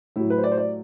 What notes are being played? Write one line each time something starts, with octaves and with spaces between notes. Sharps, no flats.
A2 F#3 E4
B4
C5
D5
C5
D5